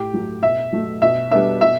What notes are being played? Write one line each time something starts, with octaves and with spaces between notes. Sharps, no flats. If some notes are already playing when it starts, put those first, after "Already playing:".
Already playing: A2 G4
F#3 A3
B2 E5
F#3 A3
B2 E5
G3 B3 D4 E5
B2 E5